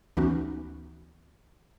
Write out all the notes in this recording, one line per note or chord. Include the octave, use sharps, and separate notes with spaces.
D2 E3 B3 C#4 D#4 F#4